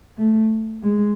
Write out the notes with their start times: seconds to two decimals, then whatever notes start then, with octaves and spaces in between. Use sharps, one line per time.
0.17 A3
0.82 G#3